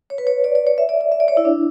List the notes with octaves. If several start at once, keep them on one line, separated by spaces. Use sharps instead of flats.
C#5
B4
C#5
D5
D5
C#5
E5
D5
D5
E5
D5
C#5
E4
D4